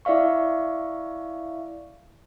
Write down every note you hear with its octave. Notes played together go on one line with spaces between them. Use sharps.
E4 D5 E5 F5 C#6